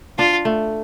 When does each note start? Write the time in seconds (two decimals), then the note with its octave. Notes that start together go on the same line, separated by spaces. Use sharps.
0.18 D4 F4
0.45 A3